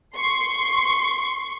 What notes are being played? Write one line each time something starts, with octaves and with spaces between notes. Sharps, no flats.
C6 C#6 C7